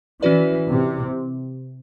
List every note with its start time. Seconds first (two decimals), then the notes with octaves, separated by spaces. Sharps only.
0.22 E3 C#4 F#4 B4 D5
0.69 C3